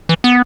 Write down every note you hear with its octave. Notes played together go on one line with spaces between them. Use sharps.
E3
B3